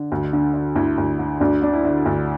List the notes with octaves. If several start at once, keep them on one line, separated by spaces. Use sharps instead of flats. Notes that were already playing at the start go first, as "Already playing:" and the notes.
Already playing: D3
D2
D3
D3
D2 E4
D2
D3
D2 D4
D3 D4
E4
D3
D2